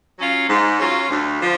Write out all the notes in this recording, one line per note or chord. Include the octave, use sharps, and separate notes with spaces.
F#3 C#4 F4
G#2
F#3 C#4 F4
D2
D3 F3